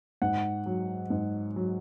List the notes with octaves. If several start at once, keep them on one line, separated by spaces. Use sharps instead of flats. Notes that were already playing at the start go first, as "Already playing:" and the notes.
G#2 F#5
F#3
G#2
F#3